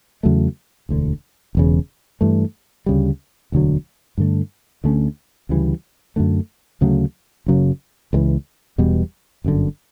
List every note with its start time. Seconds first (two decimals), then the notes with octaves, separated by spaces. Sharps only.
0.23 E2 C#3 F#3 A3
0.89 E1 D2 D3
1.55 E1 E2 C#3
2.21 G2 E3 A3
2.86 D2 C#3 G3
3.52 E1 D2 D3 F#3
4.18 G2 D3 A3
4.84 D2 D3 A3 C#4
5.49 D2 C#3 E3 G3
6.16 F#2 D3 A3
6.81 D2 C#3 F#3 A3
7.46 F#1 F#2 C#3 F#3
8.13 C#2 C#3 E3
8.78 E1 E2 B2 G3
9.44 G1 F#2 D3